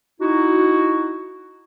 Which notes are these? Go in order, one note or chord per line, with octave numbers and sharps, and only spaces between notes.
D#4 E4 F#4